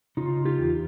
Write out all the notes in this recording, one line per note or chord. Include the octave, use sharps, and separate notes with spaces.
C#3 D#4 F4
F4 G4
E2